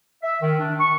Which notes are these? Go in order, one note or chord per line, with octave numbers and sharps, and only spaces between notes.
E5
D#3
D4
C#6